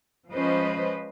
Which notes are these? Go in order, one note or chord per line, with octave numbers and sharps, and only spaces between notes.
F3 G#3 C#4 B4 C5 D#5